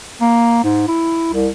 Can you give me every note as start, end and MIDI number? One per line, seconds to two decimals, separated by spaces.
0.21 0.63 58
0.64 0.84 44
0.87 1.33 64
1.33 1.48 36